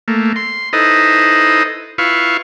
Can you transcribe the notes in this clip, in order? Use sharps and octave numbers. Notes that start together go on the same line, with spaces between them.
A3 A#3
C6
D#4 E4 A4 B4 C5 D#5
E4 F4 B4 F5 C#6